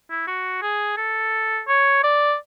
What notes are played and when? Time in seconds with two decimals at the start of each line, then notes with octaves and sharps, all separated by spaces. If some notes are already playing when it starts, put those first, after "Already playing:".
0.10 E4
0.27 F#4
0.62 G#4
0.97 A4
1.68 C#5
2.03 D5